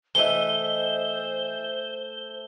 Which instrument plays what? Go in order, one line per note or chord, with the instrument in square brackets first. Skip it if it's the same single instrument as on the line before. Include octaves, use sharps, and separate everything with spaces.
[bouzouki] E3 D#5 [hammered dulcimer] A3 E5 [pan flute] C5 [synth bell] G7